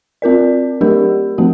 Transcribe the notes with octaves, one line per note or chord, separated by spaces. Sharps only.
C4 F4 A#4 D5
F#3 A3 D4 G4 A#4
F3 A3 C4 F#4